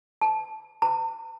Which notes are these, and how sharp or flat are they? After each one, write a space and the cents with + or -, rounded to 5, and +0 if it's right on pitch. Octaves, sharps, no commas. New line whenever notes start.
A5 -20
A5 +45